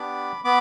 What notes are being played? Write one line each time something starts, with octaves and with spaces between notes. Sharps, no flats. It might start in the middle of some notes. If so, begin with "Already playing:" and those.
Already playing: B3 D4 G4 B5 D6
B3 B5 D6